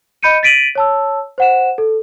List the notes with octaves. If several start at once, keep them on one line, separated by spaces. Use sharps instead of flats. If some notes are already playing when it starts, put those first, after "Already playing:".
D#5 B5 G6 C#7 D#7
A6 B6 D7 D#7 F#7
C#5 A5 E6
C5 F#5 E7
A4